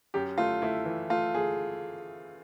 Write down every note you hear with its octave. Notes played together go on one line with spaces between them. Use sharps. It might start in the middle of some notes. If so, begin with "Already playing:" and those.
F#2 G4
A3 F4
A3 E4
E3
A3 F4
A3 G#4